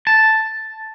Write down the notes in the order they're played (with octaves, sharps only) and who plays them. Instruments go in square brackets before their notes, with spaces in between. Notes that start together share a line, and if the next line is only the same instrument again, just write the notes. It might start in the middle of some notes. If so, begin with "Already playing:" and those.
[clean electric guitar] A5